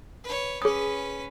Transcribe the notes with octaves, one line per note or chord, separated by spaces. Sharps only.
B4 C#5
C#4 G#4 B4 D#6